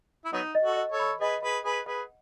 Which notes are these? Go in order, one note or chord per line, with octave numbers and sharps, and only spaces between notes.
E4
F#3 B3 D#4 F#5
D#5
F#4 A4
D#5
A4 C#5
B5
G#4 B4 D#5
G#4 B4 F#5
G#4 B4 F#5
G#4 B4 F#5